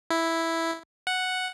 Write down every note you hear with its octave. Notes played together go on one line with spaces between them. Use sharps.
E4
F#5